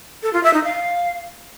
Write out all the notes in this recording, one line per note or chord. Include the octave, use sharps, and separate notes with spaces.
A4
F4
E5
D#4
F5